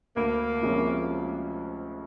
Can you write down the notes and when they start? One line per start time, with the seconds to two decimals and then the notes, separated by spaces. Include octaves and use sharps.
0.16 D2 A#3
0.61 C3 F3 G#3 C#4